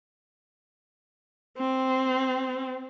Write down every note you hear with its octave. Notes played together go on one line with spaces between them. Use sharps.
C4